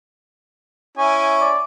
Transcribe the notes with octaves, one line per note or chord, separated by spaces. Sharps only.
C#4 E4 G#5
D5